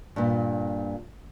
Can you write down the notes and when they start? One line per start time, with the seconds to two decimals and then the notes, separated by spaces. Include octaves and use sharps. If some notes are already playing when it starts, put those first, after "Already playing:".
0.16 G2 A#2